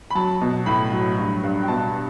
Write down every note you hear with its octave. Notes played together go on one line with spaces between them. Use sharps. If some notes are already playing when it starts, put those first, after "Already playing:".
B5
F#3 A5
B2
A2 B5
F#3
G2
G2
G5
B2 A5